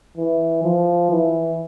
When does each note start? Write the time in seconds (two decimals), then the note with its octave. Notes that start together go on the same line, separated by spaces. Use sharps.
0.17 E3
0.64 F3
1.11 E3